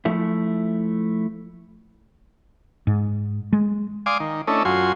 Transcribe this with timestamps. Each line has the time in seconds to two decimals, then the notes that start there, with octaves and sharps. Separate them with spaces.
0.05 F3 A3 E4
2.87 G#2
3.53 G#3
4.06 D5 F5 G#5 C6 D6 D#6
4.20 D#3
4.47 A3 C#4 D4 E4 A4 D#5
4.65 F#2 F4 F#4 G#5 C6